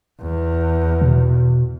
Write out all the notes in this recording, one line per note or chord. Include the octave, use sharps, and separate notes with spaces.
E2
B2